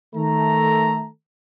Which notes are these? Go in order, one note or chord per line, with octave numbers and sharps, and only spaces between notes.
D#3 A3 A4 A#5